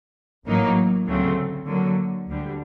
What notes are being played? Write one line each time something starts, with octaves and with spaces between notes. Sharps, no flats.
A1 A2 F#3 A#3 D#4
D2 C#3 F#3 A3 C4
D3 F#3 A#3
D2 D3 G3